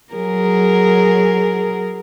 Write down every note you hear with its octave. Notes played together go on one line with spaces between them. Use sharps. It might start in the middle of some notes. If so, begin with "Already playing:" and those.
F#3 G#4 A#4